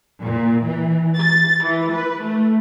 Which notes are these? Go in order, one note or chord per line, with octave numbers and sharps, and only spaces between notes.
A#2
E3
A6
E3
B4
A3